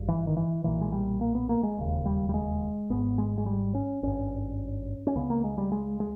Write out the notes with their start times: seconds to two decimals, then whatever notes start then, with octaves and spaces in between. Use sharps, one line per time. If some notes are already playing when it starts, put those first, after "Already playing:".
Already playing: G#1 G2
0.08 E3
0.27 D#3
0.37 E3
0.64 B1 A#2 E3
0.81 G#3
0.92 G3
1.21 A#3
1.35 B3
1.49 A#3
1.63 G#3
1.77 E1 D#2 C#3
2.06 G3
2.29 G3
2.34 G#3
2.90 G#1 G#2 B3
3.18 G#3
3.38 G#3
3.46 G3
3.75 C#4
4.03 G#1 G2 C#4
5.07 C#4
5.16 C#2 C#3 B3
5.30 A#3
5.44 G#3
5.58 G3
5.72 G#3
6.00 G#3